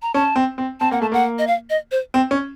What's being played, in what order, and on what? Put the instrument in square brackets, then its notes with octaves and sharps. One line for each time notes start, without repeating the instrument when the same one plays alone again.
[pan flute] A#5
[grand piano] C#4 [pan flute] A5
[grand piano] C4
C4
[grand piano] C4 [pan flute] A5
[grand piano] A#3 [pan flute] F#5
[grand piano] A3 [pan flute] A5
[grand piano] A#3 [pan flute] F#5
[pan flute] D#5
F5
D#5
C5
[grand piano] C4
C#4